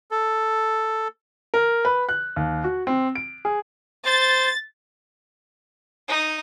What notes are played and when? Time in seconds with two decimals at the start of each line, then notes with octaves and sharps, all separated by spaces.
0.11 A4
1.54 A#4
1.85 B4
2.09 F#6
2.36 D#2
2.64 F#4
2.87 C4
3.15 D7
3.45 G#4
4.06 C5 A6
6.08 D#4